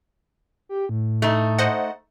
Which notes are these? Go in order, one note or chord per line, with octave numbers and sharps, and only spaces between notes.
G4
A2
A3 D#4
C5 D#5 F#5